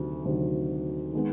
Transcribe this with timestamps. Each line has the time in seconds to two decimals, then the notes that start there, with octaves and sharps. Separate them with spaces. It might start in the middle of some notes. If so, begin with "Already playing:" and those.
Already playing: D2 C3 D#3 F#3
0.25 D2 C3 D#3 F#3
1.13 D#3 G#3 B3